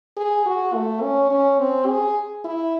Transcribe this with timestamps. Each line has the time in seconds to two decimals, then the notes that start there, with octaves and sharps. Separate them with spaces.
0.17 G#4
0.46 F#4
0.74 A3
1.02 C#4
1.31 C#4
1.60 C4
1.88 G#4
2.45 E4